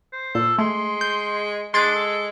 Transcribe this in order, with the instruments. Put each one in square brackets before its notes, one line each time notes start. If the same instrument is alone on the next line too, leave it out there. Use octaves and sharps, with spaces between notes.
[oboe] C5
[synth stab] A#2 [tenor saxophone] A4
[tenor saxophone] G#3 [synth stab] A3 [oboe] C6
[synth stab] G6
[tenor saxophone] G#3 [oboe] D4 [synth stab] C6 A6 D7
[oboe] A4